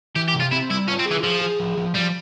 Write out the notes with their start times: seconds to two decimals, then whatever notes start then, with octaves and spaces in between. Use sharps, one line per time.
0.16 E3 G4
0.28 G4
0.34 C3
0.40 F4
0.51 C4 E4
0.70 G3 E4
0.88 C#4 F4
0.99 C4
1.06 G#4
1.11 E3
1.23 F3 G#4
1.41 G#4
1.60 F3
1.77 F3
1.94 F3 G3